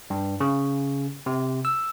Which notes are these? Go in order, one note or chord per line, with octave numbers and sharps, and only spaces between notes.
G2
C#3
C3
E6